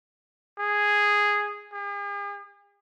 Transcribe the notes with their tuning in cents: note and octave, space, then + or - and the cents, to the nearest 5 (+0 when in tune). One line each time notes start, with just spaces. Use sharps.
G#4 -5
G#4 -45